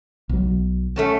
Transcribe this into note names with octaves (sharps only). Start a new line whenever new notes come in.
B1 F#3
A3 C#4 A5